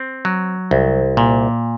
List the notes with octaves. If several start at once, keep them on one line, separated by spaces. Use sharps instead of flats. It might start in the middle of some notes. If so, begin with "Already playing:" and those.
Already playing: C4
F#3
C2
A#2